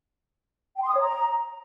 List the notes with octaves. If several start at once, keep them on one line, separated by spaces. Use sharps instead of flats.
G5
C6
D#6
C#5
A#5